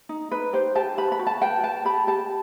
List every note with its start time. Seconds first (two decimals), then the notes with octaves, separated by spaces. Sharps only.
0.09 D#4
0.31 D#4 B4
0.53 G4 C5
0.75 G4 A5
0.98 B4 B5
1.12 B5
1.19 F#4
1.27 A5
1.41 B4 G5
1.63 B4 A5
1.85 G4 B5
2.07 G4 A5